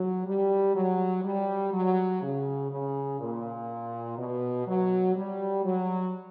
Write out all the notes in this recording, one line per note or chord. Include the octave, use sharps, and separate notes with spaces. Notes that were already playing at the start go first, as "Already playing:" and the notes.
Already playing: F#3
G3
F#3
G3
F#3
C#3
C#3
A#2
B2
F#3
G3
F#3